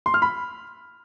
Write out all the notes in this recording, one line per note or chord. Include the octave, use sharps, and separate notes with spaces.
C6
F6
B5